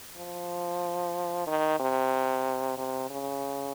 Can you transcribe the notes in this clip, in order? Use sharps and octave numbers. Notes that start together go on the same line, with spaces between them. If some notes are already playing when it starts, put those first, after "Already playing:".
F3
D#3
C3
C3
C#3